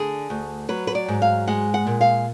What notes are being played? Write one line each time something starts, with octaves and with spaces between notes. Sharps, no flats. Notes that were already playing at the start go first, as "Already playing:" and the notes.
Already playing: D3 G#4
D2
F#3 B4
B4
D5
G#2
F5
G#3 F#5
F#5
A#2
F5